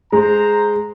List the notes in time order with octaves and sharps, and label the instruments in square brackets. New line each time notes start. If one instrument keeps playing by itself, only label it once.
[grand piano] G#3 [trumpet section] C5 A#5